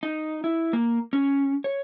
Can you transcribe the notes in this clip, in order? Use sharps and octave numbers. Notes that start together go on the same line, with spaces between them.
D#4
E4
A#3
C#4
C#5